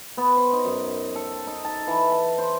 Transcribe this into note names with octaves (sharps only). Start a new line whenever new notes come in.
B3
C5
D#4
F#2
A4
D#4
A5
E3
A5
C5